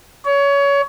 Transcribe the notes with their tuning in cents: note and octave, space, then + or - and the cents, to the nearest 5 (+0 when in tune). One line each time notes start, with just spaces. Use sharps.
C#5 +25